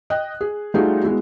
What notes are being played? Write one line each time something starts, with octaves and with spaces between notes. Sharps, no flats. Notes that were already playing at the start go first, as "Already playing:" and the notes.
D#5 G5 F#6
G#4
G3 A3 D#4 F4 F#4 G#4
G#3 B3 E4 F#4